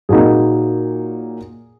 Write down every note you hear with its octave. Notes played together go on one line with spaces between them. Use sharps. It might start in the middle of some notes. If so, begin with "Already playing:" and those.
A#2 F#3 A#3 D#4 G#4